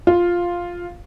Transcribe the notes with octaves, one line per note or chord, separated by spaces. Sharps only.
F4